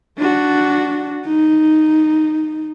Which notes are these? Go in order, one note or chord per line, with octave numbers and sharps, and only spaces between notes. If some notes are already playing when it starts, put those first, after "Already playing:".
D4 F#4
D#4